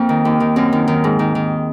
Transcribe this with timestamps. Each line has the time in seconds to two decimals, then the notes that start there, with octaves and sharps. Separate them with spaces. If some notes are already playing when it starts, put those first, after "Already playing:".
Already playing: F2 A#3 C4
0.09 D#3
0.25 D#2
0.40 D#3
0.56 F#2 C4
0.73 D#3
0.88 D#3
1.04 G#2
1.19 D#3
1.35 D#3